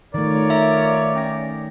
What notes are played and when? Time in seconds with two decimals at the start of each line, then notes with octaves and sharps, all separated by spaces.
0.14 D#3 A3 F4 A#4 C#5 D5
0.50 E5 A#5
1.15 C#4 G5 A#6